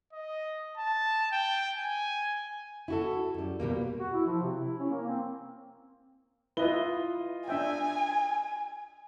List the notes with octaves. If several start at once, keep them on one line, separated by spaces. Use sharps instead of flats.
D#5
A5
G5
G#5
E4 F#4 A4
F#2 G3
F2 B2 G3 A#3
F#4
E4
F3
C3
E4
C#4
A#3
C4
E4 F4 B4 D#5 G7
D4 E5 G5 G#5